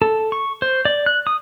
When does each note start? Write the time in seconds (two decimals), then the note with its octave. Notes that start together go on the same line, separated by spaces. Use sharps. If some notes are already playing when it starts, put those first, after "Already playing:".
0.02 A4
0.32 C#6
0.62 C5
0.85 D5
1.06 F#6
1.27 D#6